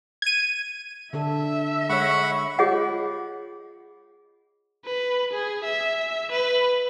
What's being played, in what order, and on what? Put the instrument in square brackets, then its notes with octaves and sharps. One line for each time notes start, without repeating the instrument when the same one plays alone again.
[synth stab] G#6 D#7
[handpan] D3 D4 A4 [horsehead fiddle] E5
[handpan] G#3 C#5 [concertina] F#5 B5 C#6
[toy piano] F4 G#4 C#5 D#5 F#5
[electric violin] B4
G#4
E5
B4